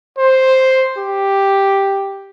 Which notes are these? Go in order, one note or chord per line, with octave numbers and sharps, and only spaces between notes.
C5
G4